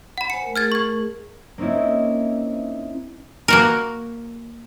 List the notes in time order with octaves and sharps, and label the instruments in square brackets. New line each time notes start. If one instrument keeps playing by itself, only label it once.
[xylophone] F#5 B5
[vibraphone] C5 G#5 [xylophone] C#7
[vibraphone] A3 A#4
[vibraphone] A3 G#4 A#4 [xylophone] F6 G#6 A6
[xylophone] C#6 G#6
[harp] A#3 C4 C#4 D#4 E4
[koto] A#3 F#4 A#4